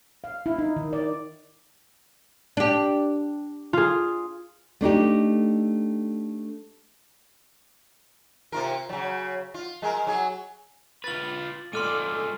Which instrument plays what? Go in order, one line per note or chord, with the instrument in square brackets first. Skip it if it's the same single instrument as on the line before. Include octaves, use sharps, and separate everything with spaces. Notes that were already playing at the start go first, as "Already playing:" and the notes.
[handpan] F5
E4
D#4
D#3
D5
[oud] D4 G4
[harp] F4 G#4
[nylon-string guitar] A3 D4 D#4 G4
[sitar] C3 F4 A#4
C#3 F#3
F4
G#3 G#4 A#4
F#3 G#4
[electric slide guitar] F4 B4 [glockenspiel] A6 F#7
[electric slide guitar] G#3 F4 D5 [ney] A4 [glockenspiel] C6 F6 D#7